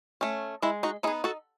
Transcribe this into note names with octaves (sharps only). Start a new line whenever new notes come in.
A3 C#4
G#3 E4
D#4 F#4
B3 D#4 E4 G#4
F#4 A4